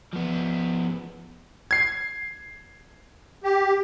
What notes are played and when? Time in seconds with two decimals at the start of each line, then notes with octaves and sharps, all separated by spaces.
0.13 F3 B3
1.71 G#6 C7
3.44 G4